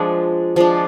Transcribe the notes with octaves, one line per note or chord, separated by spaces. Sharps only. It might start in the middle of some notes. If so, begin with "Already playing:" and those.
Already playing: F3 G#3 D4
F3 G#3 D4